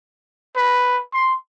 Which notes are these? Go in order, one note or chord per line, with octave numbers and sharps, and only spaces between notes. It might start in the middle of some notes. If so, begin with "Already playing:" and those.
B4
C6